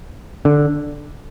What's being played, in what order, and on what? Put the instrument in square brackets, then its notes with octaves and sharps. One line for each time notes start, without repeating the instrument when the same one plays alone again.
[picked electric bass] D3